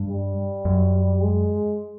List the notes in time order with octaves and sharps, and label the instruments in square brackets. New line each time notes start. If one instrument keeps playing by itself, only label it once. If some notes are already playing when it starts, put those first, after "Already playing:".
Already playing: [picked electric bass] G2
[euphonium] G3
[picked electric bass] F#2
[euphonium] G#3